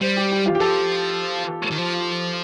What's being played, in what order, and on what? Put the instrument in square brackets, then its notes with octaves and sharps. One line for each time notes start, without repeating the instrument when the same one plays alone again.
[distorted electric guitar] G3 [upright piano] C5
[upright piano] G4
G4
F4
G4
[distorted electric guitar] F3 [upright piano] A4
[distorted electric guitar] D#3
F3